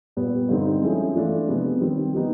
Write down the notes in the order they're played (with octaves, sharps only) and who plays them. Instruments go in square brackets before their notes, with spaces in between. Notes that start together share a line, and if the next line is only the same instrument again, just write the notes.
[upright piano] A#2 G3 B3
G2 D3 G3 C4 D#4
F3 G#3 C#4 E4 A4
E3 A3 D4 F4 A4
C3 F3 G#3 B3
D#3 G3 C4
G3 B3 D#4 G4